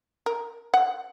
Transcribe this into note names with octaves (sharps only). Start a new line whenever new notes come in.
A#4
F#5